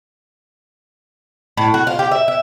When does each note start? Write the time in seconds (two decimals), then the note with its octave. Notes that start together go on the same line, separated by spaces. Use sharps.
1.57 A2
1.74 F#4
1.87 F4
1.99 G4
2.12 E5
2.28 E5